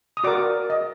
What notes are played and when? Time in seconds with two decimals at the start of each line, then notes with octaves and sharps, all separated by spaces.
0.17 D#6
0.24 F#4 A#4 D5 D6
0.70 D#5